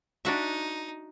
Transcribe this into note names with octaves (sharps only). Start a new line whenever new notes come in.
D4 D#4 F#4 E5